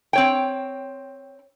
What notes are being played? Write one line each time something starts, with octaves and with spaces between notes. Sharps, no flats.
C4 C#5 G5